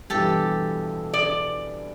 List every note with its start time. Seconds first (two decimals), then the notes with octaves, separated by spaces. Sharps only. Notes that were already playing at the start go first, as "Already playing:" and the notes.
0.10 G2 B2 E3 G4 A4
1.14 D5